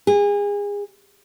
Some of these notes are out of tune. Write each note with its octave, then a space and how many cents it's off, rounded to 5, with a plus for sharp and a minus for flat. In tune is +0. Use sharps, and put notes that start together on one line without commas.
G#4 -30